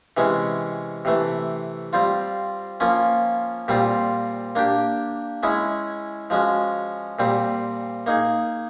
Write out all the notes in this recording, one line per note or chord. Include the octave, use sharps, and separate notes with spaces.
C3 E3 G#3 C#4
C3 E3 A3
G3 C4 F4
F3 A#3 C#4 F4
A#2 G3 C4 F4
A#3 D4 G4
G#3 C#4 E4 G#4
F3 G#3 C#4 F#4
A#2 G3 C4
A#3 D#4 G#4